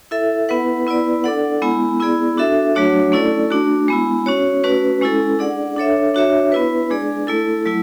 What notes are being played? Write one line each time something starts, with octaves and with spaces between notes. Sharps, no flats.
E4 A4 E5
B3 E4 B4 F#5
B3 E4 B4 D5
D4 A4 D5 F#5
G#3 B3 E4
B3 E4 G#4 D5
D4 F#4 A4 E5
F#3 A3 D4 F#4 C#5
A3 C#4 E4 A4 D5
A3 D4 F#4
G#3 B3 E4
C#4 F#4 C#5
A3 C#4 F#4 B4
G#3 C#4 E4 A4
D4 G#4 D5 F#5
D4 A4 C#5 E5
D4 F#4 C#5 E5
B3 E4 B4
G#3 D4 G#4 D5
A3 E4 A4
F#3 A3 E4